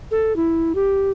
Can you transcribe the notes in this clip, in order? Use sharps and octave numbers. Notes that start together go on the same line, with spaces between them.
A4
E4
G4